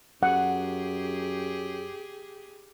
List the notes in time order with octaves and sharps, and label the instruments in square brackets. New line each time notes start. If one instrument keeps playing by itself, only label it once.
[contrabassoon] F#2 [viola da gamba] G4 G#4 [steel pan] F#5